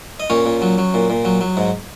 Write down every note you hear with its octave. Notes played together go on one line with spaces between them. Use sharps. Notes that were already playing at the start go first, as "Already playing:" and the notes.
D#5
A#2 C#4 C#5
A#2
F#3
F#3
A#2
A#2
F#3
F#3
G#2